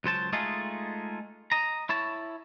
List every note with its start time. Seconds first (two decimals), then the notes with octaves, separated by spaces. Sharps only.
0.04 C#2 F#3 C5 A5
0.33 G#3 A3 D#4 F4 G#4 A4
1.52 D#5 A#5
1.89 E4 C#5 A5